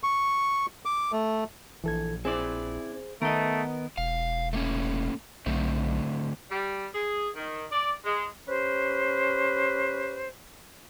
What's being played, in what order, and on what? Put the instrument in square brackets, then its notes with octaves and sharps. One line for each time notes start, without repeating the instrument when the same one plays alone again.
[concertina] C#6
D6
A3
[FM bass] A#1 [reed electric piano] E3 A4 G#6
[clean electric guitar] C4 E4 D5 [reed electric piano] G#4 C5
[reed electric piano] D#3 [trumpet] A3 [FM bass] B3 [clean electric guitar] A#4 D#5
[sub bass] E1 [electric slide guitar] F5
[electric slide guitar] A3 A#3 C#4
[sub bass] B1 [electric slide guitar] D3 A3 C4
[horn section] G3
G#4
D#3
D5
G#3
[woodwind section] C#4 G4 B4 C5